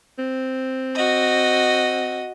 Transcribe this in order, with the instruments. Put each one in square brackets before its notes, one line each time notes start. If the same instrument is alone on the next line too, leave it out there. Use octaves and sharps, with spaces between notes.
[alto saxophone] C4
[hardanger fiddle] F#4 D#5